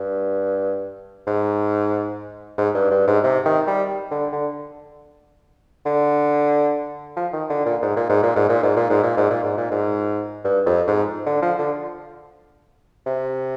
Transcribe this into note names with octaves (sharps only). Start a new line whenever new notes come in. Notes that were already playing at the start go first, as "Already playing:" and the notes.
Already playing: G2
G#2
G#2
G2
G2
G#2
C3
D#3
G3
D3
D3
D3
F3
D#3
D3
A#2
G#2
A#2
G#2
A#2
G#2
A#2
G#2
A#2
G#2
A#2
G#2
A#2
G#2
A#2
G#2
G2
F2
G#2
D3
F3
D3
C3